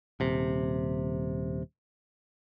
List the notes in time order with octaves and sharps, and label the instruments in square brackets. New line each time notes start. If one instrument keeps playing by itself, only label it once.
[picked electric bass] D#1 C3